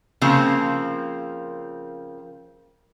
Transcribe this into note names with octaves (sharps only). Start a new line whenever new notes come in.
C#3 F3 A#3 C4